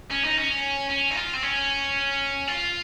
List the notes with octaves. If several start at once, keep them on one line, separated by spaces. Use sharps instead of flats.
C#4
D#4
C#4
C#4
D#4
F4
C4
C#4
F4